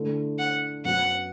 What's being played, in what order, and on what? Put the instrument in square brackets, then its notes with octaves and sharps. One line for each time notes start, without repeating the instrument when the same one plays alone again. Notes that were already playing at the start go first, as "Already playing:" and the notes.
Already playing: [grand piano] D3 A3 E4
[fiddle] F#5
[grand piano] F#2 F#3 B3 F#4 [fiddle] F#5